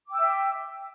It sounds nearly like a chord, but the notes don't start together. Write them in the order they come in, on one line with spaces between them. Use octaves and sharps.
D6 G5 E6 E5